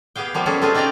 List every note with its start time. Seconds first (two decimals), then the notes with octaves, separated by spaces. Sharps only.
0.16 B3 G4 G#4 F5 G5
0.34 F3 G3 A#3 B3
0.46 G3 C#4 G#4 A4 B4 C#5
0.62 A3 C4 F4 G4 G#4
0.75 C#4 D#4 G4 D5 G5 A#5